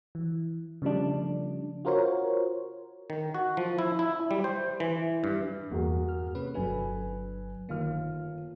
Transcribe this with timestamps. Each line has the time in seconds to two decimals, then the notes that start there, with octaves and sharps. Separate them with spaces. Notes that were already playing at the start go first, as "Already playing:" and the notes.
0.15 E3
0.82 C#3 F3 G3 A3 D4
1.85 F4 F#4 A#4 C5 C#5
3.10 D#3
3.35 F#4
3.57 F3
3.79 E4
3.99 E4
4.31 G3
4.44 C5
4.80 E3
5.24 G2
5.71 E2 G2 A#3 F#4 G#4
6.09 F6
6.35 C3 C#4 B4
6.54 G1 F#3 D4 A4 B4 G#5
7.69 G1 D#3 A#3 F4 F6